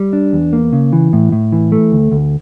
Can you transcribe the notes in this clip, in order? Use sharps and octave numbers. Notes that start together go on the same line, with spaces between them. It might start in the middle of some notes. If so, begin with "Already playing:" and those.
Already playing: G3
D4
E2
A#3
C#3
E3
A2
A2
E3
A3
D2
D2